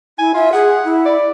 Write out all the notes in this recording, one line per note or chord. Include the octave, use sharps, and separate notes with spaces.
E4 G#5
F4 E5
G#4 F#5
E4
D5